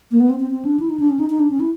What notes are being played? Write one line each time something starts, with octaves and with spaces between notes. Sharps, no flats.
A#3
B3
C4
C4
C4
D4
E4
D#4
D4
C#4
D#4
D#4
D4
C#4
E4